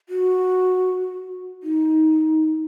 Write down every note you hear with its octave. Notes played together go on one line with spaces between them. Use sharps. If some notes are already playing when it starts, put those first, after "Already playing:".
F#4
D#4